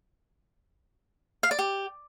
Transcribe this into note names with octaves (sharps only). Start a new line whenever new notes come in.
F5
D5
G4